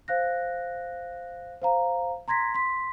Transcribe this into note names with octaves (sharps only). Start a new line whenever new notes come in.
C5 F5 F#6 A#6
C5 F5 A#5
A#5 C6 G#6 A#6 B6
C6 B6